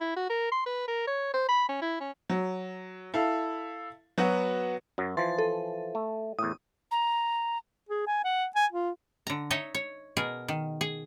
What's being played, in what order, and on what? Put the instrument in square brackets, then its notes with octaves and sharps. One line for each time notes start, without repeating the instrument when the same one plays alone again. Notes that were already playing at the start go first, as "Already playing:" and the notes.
[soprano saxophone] E4
F#4
A#4
C6
B4
A#4
C#5
C5
B5
C#4
E4
C#4
[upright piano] F#3
E4 A4 F5
F#3 B3 F#4
[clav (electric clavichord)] F#2 F#3
[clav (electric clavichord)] E3 F3 [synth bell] C6 A6
[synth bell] A4
[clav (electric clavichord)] A3
[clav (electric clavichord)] E2 A2 [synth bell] D#6
[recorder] A#5
[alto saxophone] G#4
G#5
F#5
G#5
F4
[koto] D3 A#5
D#4 C#5 D#5 E5
C#5
B2 G#4 A#4
D#3
G#4